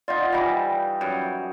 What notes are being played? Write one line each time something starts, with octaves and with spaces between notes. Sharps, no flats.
D#4 F4 D5 D#5 F#5
E3 G3 D#4 A#6 B6
F#2